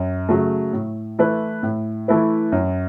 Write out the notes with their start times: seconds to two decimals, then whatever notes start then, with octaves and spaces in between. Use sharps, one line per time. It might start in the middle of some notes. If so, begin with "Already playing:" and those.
Already playing: F#2
0.29 C#3 F#3 A3
0.73 A2
1.19 E3 A3 E4 B4
1.63 A2
2.08 E3 A3 E4 B4
2.52 F#2